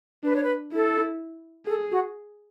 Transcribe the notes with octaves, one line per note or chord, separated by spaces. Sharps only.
D4 B4
C#5
B4
E4 A4
G#4 A4
F#4